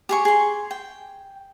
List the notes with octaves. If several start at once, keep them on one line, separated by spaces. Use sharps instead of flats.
G4 G#4 C#6
G#4 C6
G5